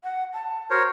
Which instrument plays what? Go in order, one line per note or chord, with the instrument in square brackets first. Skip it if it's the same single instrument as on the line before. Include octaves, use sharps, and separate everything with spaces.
[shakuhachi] F#5
A5
[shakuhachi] F#4 [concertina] A#4 C5 C#5